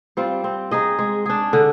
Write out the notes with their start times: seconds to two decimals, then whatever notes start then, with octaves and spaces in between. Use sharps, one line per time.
0.17 G3 C4 F4
0.44 C4
0.71 D#4 G#4 D#5
0.99 G#3
1.26 D4 G#4
1.53 D3